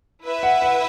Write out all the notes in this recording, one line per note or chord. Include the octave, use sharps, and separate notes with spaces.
E4 B4 E5
F#5
F#5